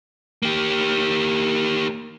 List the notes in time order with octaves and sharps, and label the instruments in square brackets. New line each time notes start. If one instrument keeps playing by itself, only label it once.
[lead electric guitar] A#3 G4